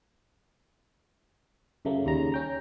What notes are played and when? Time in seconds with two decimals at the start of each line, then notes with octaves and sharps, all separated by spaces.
1.85 F#2 C#3 A3 A#3
2.05 D#2 C#3 G3 A#5
2.32 C#4 G5 A#5